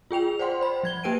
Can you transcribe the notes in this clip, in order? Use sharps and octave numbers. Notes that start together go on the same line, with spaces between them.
F4 G#4 G5 F7
C5 D5 F#5 G5 C6
C5 B5
F3 G#6 G7
A#3 G4 B4 G5 D7 D#7